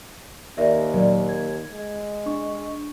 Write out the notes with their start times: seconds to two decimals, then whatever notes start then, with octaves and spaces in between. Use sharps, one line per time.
0.58 D#2 A#4 D5 E5 A#6
0.94 A#2 F#3 A#4 D5
1.29 G#6
1.71 G#3
2.26 D4 C#6